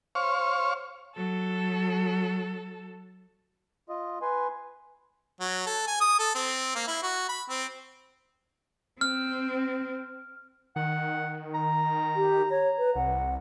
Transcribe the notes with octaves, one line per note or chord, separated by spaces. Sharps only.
C5 C#5 F5 C#6
F#3 A4
F4 D#5
B4 G#5 C6
F#3
A4
G#5
D#6
A4
C4
A#3
E4
F#4
B5
C4
C4 F6
D#3 F#5
A#5
G4
C#5 A#5
B4
C2 F#5